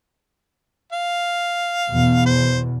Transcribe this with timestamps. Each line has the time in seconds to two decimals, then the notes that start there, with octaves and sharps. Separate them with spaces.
0.92 F5
1.90 E2 B2
2.26 C5